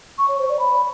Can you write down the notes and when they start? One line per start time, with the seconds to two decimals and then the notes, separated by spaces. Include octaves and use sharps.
0.18 C#6
0.28 C#5
0.39 C5
0.49 D5
0.59 B5